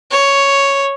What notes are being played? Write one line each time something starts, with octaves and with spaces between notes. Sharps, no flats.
C#5